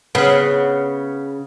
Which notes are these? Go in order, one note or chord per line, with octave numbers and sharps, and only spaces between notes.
C#3 B3